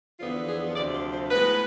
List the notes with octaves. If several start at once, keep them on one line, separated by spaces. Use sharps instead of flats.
E2 D3 F3 B3 F4
G#4
D2 C3 F3 D5
C5
C5
A2 G#3 B3 B4